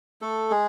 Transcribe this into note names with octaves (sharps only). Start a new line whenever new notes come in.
A3 A4
G#3 G#4